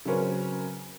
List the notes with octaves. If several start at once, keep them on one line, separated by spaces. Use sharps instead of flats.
C#3 F#3 C4 C#4 A#4 B4